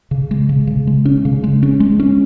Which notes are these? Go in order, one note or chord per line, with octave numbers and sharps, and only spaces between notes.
C#3
G#3
C#3
C#3
G#3
C#4
C#3
G#3
C#4
G#3
C#4